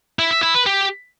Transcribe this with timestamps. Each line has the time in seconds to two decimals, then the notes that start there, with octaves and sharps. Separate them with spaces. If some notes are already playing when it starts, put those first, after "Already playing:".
0.19 E4
0.31 E5
0.43 E4
0.55 B4
0.66 G4